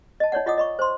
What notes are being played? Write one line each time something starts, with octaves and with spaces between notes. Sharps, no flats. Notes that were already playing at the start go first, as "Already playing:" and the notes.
D#5 A5
D#4 C#5 D5 F#5
F4 D#5 F#5 D6 D#6
D#5 B5 C#6
C5 C6